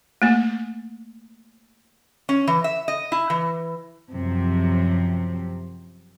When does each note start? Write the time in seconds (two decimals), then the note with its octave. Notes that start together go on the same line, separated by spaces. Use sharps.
0.22 A3 A#3
2.29 C#4
2.47 E3
2.64 E5
2.88 D#5
3.12 E4
3.30 E3
4.10 F#2 C3 F3